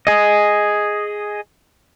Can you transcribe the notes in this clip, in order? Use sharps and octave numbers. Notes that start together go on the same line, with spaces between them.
G#4 D#5